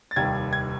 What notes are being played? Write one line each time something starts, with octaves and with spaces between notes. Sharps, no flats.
A6
F1 D#2 D#3 G3 G#6
G#6